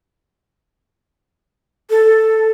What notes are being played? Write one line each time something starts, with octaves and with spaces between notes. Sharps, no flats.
A4